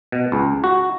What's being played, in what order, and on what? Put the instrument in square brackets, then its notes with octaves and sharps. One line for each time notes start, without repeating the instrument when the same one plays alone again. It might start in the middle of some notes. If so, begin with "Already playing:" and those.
[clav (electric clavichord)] B2
C#2
F#4